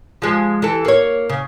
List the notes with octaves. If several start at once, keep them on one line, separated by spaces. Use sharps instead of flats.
F3 G#3
E3 A4
A#3 C#5
C#3